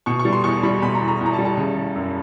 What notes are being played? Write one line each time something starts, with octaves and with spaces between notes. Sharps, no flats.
B2 C#6
C#6
G3
C6
E2 C#6
G3 B5
B2 B5
A#5
E2
A#5
E2
A#5
A5
G3
A5
C#3
C#3
F#2